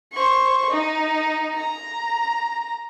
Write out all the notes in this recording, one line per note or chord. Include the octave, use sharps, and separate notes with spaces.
C5 C#6
D#4
A#5